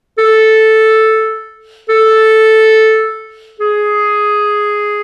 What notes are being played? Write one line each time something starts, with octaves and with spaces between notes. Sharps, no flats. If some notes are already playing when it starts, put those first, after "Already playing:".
A4
A4
G#4